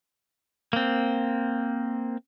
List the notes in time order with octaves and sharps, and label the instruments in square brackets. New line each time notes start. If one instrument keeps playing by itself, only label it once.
[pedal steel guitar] A#3 C4